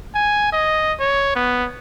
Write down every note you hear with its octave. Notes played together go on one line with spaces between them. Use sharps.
G#5
D#5
C#5
B3